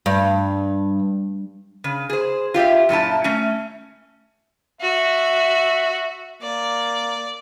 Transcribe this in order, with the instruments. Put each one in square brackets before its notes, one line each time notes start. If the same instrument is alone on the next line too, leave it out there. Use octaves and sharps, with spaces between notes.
[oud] G2
[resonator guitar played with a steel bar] C#3
G#4 C5
F4 G4 D5 E5
F#2 A#2 E4 A5
A3 C#4
[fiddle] F#4 [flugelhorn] E5
[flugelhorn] A#3 [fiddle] D5